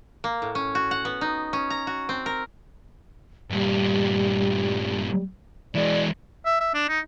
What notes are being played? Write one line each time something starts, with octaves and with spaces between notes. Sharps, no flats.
A#3
A2
C#4
F#4
F#5
B3
D#4
C#4
A#5
F#4
C4
A#4
G2 A#2 G3
E3 G#3 D5
E5
E5
D4
D#4